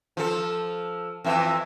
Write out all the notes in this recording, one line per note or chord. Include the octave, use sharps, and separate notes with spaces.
F3 A4
F2 E3 E5